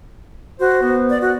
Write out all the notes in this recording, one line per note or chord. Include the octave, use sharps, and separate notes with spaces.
F#4 C5
B3
D5
F#4